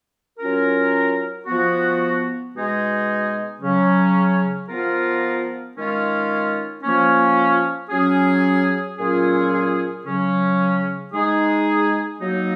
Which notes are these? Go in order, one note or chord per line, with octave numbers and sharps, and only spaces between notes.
F#3 C#4 F4 A#4
F3 B3 F#4
B2 G#3 D#4 G#4
C#3 F#3 C#4
F3 B3 F4 A#4
D#3 G#3 C#4 F4
F3 A#3 C#4
F#3 C#4 G#4
A#2 F#3 C#4 F4 G#4
C#3 F#3 C#4
G#3 D#4 G#4
F#3 A#3 D#4